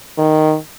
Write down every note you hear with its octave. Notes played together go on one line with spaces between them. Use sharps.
D#3